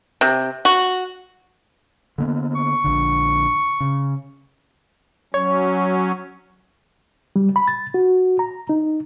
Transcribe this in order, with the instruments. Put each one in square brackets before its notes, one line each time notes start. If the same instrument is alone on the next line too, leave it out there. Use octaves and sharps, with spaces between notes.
[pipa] C3
F#4
[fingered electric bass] D3 A#3 B3
[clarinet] C#6
[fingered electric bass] A#1 D3
C#3
[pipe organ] F#3 C#4 [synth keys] C#5
[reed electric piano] G3
B5
A6
F#4
A#5
D#4